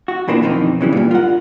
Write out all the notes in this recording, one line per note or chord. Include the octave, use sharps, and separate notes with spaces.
F#4
F2 B2 E3 A#3 D4 F4
F2 B2 D#3 E3 C4 D#4
C#3 E3 G3
G2 A#2
F4 A#4 F#5